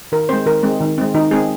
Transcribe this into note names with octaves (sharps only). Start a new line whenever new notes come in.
D#3 A#4
G#3 C4 C5
D#3 A#4
G#3 C4
D#3
G#3 C4
D#3 D#4
G#3 C4 G#4